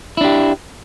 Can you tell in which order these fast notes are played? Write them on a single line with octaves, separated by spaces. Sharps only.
E4 D4 G4